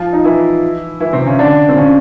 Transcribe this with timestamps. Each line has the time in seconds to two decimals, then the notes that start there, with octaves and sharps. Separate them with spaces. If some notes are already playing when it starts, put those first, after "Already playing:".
Already playing: F3 F4
0.13 D#4
0.24 E3 E4
1.00 E3 E4
1.13 C3 C4
1.26 C#3 C#4
1.38 D3 D4
1.68 C4
1.77 C#3 C#4